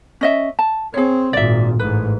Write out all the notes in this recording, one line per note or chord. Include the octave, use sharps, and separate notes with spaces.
C#4 D#5 E5
A5
C4 G#4 C#5
G#1 A#2 D5 E5
A1 G#2 B4